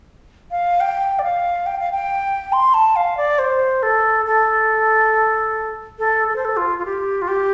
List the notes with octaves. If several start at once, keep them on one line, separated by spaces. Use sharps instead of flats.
F5
G5
D5
F5
G5
F5
G5
C6
A5
F5
D5
C5
A4
A4
A4
A4
C5
A4
F4
F4
G4
F4
G4